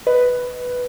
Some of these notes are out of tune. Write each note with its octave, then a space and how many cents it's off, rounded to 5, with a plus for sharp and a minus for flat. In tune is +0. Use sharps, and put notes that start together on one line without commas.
B4 +0 D#5 +0